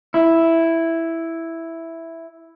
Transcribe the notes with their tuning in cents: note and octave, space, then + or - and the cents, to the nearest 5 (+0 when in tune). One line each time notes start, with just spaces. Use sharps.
E4 +0